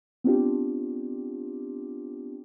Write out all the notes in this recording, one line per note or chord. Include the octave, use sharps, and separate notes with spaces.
B3 C4 D4 F4 G4